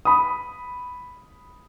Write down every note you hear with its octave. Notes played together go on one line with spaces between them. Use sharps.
B5 D#6